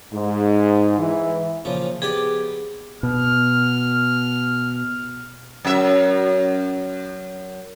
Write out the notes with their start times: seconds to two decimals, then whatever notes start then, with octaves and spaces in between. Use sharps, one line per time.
0.13 G#2
0.98 E3
1.65 A#2 C#3 F3
2.02 B3 G4 G#4 D5
3.03 B2 F6
5.65 F#2 E5